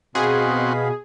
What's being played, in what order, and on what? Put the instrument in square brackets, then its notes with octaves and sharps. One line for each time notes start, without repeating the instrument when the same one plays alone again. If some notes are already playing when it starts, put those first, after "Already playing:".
[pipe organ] B2 [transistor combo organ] C4 F#4 [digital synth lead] G#4 [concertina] D#5 F5 B5